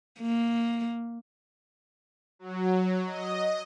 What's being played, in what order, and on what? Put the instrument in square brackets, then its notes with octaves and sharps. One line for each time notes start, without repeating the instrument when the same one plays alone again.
[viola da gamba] A#3
[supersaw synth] F#3
D#5